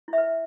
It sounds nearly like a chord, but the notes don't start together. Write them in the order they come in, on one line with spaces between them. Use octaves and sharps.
E4 E5 B4